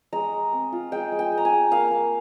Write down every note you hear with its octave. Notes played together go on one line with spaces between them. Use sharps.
G#3 A#5
G#3
C4
F4
G#3 G5
G#3
G5
G#3
A#5
G#5
G#3
A#3 F5
A#3